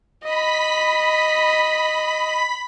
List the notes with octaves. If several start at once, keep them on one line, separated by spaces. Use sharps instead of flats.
D#5 B5 B6